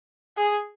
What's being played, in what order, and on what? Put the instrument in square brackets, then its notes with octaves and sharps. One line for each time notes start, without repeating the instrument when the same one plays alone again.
[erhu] G#4